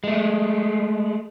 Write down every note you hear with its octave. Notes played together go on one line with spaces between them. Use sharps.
G#3 A3